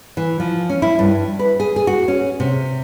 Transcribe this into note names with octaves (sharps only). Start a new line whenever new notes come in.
E3
F3
C#4
E4
G2
B4
G#4
G#4
F#4
C#4
C3